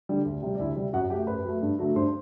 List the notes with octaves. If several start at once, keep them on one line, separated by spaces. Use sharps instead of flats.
D3 G3
D2
C3 G3
D5
D2 E4 E5
C3 G3
F#2 F#4 F#5
F#3 A3 G4 G5
F#2 B4 B5
F#3 A3
G2
D3 F#3 A3
G2 C5 C6